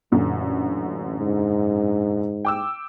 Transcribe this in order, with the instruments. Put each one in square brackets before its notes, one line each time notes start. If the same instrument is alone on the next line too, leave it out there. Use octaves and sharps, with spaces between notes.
[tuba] A1 [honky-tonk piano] F#2 A#2 D3
[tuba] G#2
[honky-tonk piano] G5 D6 E6